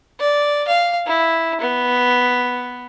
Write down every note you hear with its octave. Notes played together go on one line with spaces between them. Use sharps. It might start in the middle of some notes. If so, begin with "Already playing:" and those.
D5
F5
E4
B3